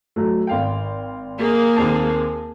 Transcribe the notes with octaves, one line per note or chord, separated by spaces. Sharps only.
F#3 A3
G#1 F5 G5
A#3 G#4
D#2 C4 A5